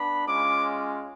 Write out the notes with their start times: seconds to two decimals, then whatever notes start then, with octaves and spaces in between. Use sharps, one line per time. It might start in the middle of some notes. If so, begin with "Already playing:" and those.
Already playing: B3 D4 B5
0.26 G#3 C#4 F4 D6